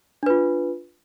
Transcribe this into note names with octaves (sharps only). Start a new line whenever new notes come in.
D4 F4 B4